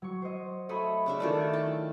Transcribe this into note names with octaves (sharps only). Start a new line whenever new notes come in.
F#3 C#6
C5 D#5
A3 C#5 D#5 B5
C#3 D4 E5
D#3 A3 C#4 E4 F4 D5
G5 A5